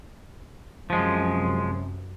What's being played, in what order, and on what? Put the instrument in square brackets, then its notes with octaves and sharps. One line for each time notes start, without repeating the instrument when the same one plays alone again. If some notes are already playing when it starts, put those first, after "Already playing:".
[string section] F#2 C3 [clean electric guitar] F3 G#3